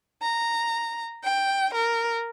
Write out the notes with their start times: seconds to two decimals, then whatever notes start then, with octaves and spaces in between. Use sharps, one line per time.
0.22 A#5
1.23 G5
1.73 A#4